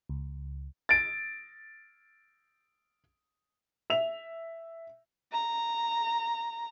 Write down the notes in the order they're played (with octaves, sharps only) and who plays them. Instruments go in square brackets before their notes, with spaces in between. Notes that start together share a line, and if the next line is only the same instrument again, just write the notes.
[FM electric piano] C#2
[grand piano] A6 D7
[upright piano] E5 F7
[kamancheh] A#5